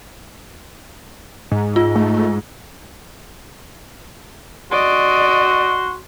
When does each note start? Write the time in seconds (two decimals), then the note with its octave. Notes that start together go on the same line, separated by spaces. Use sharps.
1.52 G#2
1.76 F4
1.96 A3
4.72 F#4 D5 D#5 C6